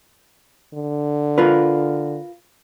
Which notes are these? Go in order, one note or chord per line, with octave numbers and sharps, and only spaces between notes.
D3
F4 A#4 B4